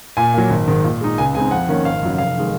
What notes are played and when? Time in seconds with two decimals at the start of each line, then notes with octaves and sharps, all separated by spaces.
0.17 A#2 G#5
0.34 F#3 A#3
0.50 G#1
0.68 G#2 D#3
0.84 A#2
1.01 G#3 D#4
1.18 C#2 G#5
1.35 C#3 G#3 C4 D#4 G#5
1.51 F2 F#5
1.68 D#3 A#3 C#4
1.85 G#1 F5
2.03 F#2 C#3 F#3
2.18 F1 F5
2.37 D#3 G#3